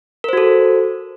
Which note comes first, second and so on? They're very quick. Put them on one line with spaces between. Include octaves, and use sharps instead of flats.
A#4 C5 F#4 A4